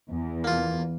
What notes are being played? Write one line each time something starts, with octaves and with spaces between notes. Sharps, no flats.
E2
A#3 F4